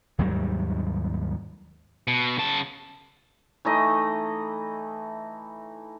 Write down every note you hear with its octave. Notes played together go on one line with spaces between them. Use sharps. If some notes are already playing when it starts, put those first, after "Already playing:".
D#2 G#2 F#3 G3
B2
C#3 A5
E3 A3 D#4 D#5